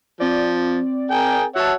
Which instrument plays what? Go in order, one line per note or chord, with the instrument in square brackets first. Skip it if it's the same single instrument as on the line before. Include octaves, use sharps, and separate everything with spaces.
[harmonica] F3 [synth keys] C4 D5
[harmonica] G#4 A#4 G5
[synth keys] F#4 A5 [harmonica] C#5 E5 F#5